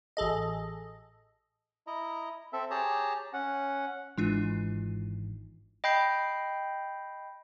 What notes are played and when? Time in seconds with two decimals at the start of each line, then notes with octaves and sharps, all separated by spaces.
0.17 A1 G#4 A4 D#5
1.87 E4 D#5 A#5
2.53 C4 A4 E5
2.71 G4 G#4 C#5 A5 A#5
3.33 C#4 F#5
4.17 G#1 G#2 E3 G#3 D4 F4
5.84 D#5 G5 B5 G6 C7